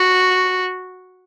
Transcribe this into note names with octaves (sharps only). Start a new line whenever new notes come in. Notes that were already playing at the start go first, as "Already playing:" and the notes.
Already playing: F#4